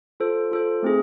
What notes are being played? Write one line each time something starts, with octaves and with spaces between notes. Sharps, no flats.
F4 A4 C5
F4 A4 C5
A3 C4 D#4 G#4